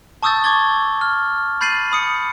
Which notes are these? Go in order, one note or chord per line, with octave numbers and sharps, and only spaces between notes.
A5 C#6 D#6 E6 G6 A6
C#6 D6 G#6 A6 G7
F6
B5 G6 A6 C7 D#7 F#7
B5 D#6 C#7